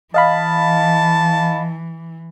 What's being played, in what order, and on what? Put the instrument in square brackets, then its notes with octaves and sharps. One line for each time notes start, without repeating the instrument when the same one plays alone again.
[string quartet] E3 [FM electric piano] D#5 F5 B5 [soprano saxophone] A5